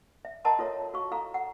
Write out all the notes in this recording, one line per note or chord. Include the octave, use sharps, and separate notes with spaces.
E5
A#4 D#5 F#5 A5 A#5 C6
F4 A4 C#5 E5
F#4 F5 C#6
E4 A4 F5 A#5
F#5